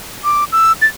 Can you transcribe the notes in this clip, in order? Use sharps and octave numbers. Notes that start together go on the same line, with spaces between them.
D6
E6
A6